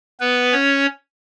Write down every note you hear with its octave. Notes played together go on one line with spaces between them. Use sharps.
B3 B4
C#4 C#5